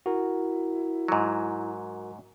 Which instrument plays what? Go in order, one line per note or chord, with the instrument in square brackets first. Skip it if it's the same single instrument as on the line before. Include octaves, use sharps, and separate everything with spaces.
[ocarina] E4 [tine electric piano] F#4 A#4
[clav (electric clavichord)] G#2 F#3